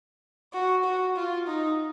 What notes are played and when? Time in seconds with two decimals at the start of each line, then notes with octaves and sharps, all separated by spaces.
0.53 F#4
0.84 F#4
1.16 F4
1.47 D#4